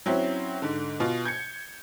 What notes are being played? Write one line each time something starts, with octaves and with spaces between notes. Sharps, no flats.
F#3 C4 C#4 E4
G#2 D3
B2 F4
G6 G#6 C#7